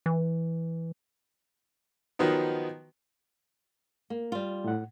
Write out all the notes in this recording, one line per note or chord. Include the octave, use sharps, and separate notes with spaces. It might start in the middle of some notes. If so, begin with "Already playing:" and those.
E3
D#3 F3 F#3 B3 D#4
A#3
G3 F4
A2 F#5